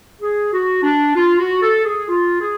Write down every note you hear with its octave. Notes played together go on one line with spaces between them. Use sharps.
G#4
F#4
D4
F4
F#4
A4
G#4
F4
G#4